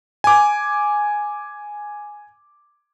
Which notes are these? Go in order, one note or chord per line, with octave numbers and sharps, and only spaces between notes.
G#5 D6